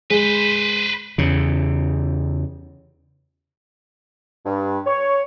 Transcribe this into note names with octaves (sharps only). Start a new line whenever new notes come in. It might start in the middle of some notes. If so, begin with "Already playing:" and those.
G#3 B4 C5
E2 C#3
G2
C#5